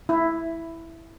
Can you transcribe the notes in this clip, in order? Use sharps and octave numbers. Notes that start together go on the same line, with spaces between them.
E4